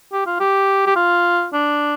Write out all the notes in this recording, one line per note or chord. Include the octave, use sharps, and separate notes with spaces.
G4
F4
G4
G4
F4
D4